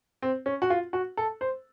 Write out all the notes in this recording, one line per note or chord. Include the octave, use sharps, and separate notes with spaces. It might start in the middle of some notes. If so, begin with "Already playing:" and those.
C4
C#4
F#4
F4
F#4
A4
C5